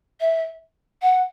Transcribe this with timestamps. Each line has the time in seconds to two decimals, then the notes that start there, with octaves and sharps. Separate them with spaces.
0.20 E5
1.02 F#5